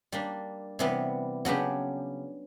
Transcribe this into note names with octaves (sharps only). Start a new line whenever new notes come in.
G3 A#3 D4
C3 E3 G3 B3
C#3 F#3 B3 D4 G4